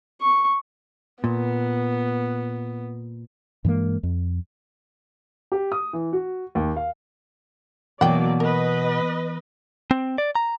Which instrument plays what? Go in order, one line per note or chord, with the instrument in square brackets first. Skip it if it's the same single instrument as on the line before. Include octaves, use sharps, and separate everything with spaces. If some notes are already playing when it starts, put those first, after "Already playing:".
[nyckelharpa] C#6
[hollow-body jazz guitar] A#2 [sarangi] B3
[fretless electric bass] G2 E3 G#3 A#3
F2
[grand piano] G4
D#6
E3
F#4
D#2
F5
[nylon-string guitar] B2 [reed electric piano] E3 [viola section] F#3 A#3 D5 [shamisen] F#5 G5
[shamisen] A#4 [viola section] B4 D#5
[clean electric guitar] C4
D5
A#5